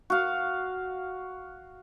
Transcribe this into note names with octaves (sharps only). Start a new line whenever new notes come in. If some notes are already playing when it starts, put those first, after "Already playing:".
F#4 F5